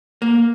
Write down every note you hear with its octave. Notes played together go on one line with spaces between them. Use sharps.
A#3